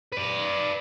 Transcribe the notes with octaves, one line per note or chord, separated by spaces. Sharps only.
B4 D5